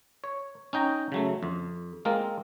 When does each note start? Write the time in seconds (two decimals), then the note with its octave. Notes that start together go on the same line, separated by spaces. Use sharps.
0.24 C#5
0.73 C#4 D#4 G5 A#5
1.12 C#3 F#3 A3
1.43 F2
2.05 G#3 A#3 C4 F4 A#4